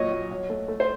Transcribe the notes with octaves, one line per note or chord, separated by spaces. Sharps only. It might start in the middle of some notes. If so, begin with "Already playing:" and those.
Already playing: A#2 F#3 C#5 D#5
F#3
F#3
A3
A3
C5